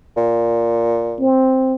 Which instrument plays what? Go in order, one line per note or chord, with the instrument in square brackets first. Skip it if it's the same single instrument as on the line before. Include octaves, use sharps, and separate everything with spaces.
[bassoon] A#2
[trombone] C4